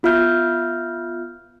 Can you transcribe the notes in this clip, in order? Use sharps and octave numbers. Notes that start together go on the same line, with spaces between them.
B3 F4 E5 F6 G6